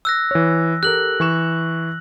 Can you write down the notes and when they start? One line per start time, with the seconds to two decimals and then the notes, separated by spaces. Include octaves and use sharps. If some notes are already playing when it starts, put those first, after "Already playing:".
0.05 E6 F#6 A#6
0.31 E3 C#5
0.83 G4 A4 A#4 F#6 F#7
1.20 E3 C#6 E7